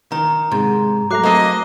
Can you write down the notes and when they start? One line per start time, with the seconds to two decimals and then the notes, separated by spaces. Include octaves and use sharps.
0.12 D#3 A#5
0.52 G#2 C3
1.11 F#3 A3 A#5 D6 F#6 C7
1.23 A#3 C4 A4 D#5